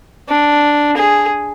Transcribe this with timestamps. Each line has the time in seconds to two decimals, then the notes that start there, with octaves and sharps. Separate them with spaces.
0.29 D4
0.98 G#4